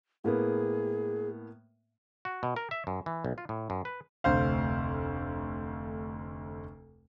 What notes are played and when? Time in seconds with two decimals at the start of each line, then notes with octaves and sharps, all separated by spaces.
0.24 A2 A#3 B3 G#4
2.25 F#4
2.43 B2
2.56 A#4
2.71 E5
2.87 F#2
3.06 E3
3.25 B1
3.38 F4
3.49 A2
3.70 F#2
3.85 B4
4.24 F1 D2 C5 F5